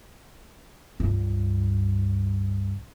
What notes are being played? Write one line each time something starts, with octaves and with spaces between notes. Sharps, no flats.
C#2 G2